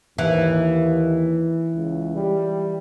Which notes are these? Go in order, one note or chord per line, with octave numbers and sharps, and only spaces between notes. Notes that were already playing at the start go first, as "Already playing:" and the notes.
D#2 E3
C#2
G3